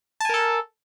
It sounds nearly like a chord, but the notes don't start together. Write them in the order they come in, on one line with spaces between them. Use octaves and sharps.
A5 G#5 A#4 A4